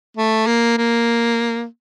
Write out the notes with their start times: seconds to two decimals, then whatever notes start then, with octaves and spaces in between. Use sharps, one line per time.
0.17 A3
0.46 A#3
0.78 A#3